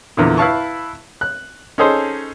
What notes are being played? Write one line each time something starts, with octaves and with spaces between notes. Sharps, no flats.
E2 A#2 D3
E4 B4 F5 A5 C#6
F#6
C#4 D#4 G#4 A4 C5